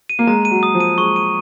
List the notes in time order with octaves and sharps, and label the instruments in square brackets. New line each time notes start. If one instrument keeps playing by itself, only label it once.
[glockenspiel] D#7
[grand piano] A#3
[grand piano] G#3 [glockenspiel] A#5
[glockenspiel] D#7
[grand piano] F#3
[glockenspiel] D#6
[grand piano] F3
[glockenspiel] D#7
[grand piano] G#3 [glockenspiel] C#6
[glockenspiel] D#7